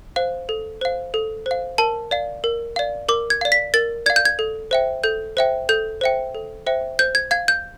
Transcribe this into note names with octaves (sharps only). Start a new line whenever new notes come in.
C5 F5
A4
C5 F5
A4
C5
F5
A#4 A5
D5 F5
A#4
D5 F5
A#4 D6
G#6
D5 F5
B6
A#4 A6
D5 F5 G#6
G6
G#6
A4
C5 E5 G5
A4 G6
C5 E5 G5
A4 G6
C5 E5 G5
A4
C5 E5 G5
C5 G6
G#6
F5 G#6
G6